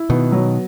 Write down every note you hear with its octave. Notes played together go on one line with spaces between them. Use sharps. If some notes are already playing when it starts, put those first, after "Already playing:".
Already playing: E4
B2 D#3 B3
F#3